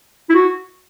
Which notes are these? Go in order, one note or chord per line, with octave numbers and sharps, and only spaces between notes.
E4
F#4